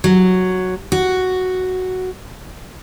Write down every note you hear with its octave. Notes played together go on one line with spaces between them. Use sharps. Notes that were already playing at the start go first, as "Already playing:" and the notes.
F#3
F#4